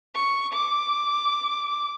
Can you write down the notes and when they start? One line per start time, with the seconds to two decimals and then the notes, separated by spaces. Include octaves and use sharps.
0.15 C#6
0.53 D6